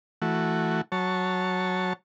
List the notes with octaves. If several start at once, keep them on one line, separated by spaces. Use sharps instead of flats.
E3 A3 F#4
F#3 C#5 A5